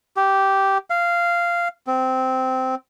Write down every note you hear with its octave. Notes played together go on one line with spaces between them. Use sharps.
G4
F5
C4